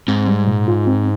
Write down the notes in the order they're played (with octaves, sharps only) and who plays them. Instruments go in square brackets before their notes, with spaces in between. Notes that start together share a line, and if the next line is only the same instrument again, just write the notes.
[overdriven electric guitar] G#2 [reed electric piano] C4
[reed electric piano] G3
A#2
F4
C4